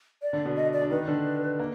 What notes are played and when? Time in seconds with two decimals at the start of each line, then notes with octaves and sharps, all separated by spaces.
0.22 D5
0.33 D3 D4
0.45 B2 B3
0.56 D#5
0.73 D5
0.82 D4
0.90 D#3 D#4 B4
1.07 D3 D4
1.59 A#3